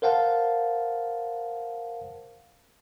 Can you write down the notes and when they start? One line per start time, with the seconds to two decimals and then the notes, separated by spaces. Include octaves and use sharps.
0.02 A#4 C5 F5 F#5 A5